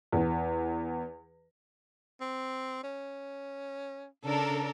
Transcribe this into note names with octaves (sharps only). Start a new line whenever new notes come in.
E2
C4
C#4
C#3 D4 A4 A#4